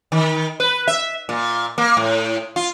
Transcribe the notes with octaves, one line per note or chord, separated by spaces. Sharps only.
D#3
B4
E5
A#2
A#3
A2
F4